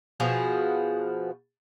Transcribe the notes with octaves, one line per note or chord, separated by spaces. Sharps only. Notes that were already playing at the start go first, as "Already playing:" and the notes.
B2 F3 F#4 G#4